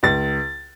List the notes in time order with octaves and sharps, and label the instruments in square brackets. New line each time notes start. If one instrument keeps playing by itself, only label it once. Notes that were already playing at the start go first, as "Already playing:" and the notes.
[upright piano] C#2 A6